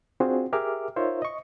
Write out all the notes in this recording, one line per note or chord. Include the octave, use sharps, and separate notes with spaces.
C4 D4 F4 F#4 G#4 C5
G4 G#4 A#4 E5 D6 F6
D#4 F4 A#4 C5 C#5 E5
D#5 C#6